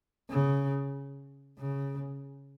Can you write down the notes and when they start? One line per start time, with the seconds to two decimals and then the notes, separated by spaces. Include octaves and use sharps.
0.30 C#3
1.59 C#3